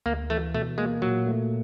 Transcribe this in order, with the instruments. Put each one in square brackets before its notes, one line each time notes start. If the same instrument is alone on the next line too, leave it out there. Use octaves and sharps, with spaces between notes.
[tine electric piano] D2 [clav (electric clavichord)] A#3
[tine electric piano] E3 [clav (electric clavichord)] A3
[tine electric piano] B2 [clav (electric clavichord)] A3
[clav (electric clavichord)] G#3 [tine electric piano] A#3
[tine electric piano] A#2 [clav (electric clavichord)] F#3
[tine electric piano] A3